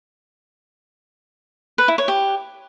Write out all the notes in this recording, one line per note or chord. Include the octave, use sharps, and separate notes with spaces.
B4
E4
C#5
G4